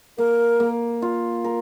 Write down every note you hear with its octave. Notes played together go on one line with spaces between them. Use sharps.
A#3 A#4
A#3
F4
A#4